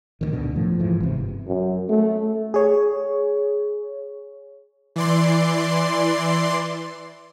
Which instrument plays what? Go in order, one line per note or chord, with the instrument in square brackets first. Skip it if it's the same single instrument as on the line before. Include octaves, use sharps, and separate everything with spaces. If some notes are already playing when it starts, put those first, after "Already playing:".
[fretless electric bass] D2 C3 D#3
D2 B2 D3
[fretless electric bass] A2 [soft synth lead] F3
[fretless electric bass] G#2 E3
G1 C3
[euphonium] F#2
A3
[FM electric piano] G#4 C#5
[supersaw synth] E3 D5 C6